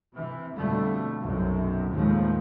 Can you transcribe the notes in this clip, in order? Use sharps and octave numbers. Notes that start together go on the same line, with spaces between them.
C3 E3
F2 B2 D3 G3 A3
B1 F#2 C3
D#2 A2 F3 G#3